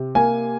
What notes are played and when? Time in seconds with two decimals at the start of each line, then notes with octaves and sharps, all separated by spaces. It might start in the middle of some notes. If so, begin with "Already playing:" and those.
Already playing: C3
0.15 A#3 G#5